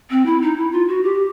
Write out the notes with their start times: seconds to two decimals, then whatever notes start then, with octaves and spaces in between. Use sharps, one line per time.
0.11 C4
0.26 E4
0.42 D#4
0.57 E4
0.72 F4
0.87 F#4
1.03 G4